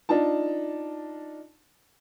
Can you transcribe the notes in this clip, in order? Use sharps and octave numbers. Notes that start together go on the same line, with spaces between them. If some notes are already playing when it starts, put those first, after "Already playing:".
D4 D#4 F4 A5